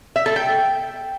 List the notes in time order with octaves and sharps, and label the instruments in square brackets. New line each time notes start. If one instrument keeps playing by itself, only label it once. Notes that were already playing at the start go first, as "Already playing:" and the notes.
[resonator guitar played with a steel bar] E5
A4
G5